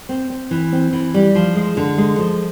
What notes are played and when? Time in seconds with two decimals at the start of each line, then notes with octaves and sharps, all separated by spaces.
0.09 C4
0.30 C4
0.51 E3
0.73 C4
0.93 E3
1.14 G3
1.35 F3
1.55 G#3
1.77 D3
1.98 G#3
2.18 F3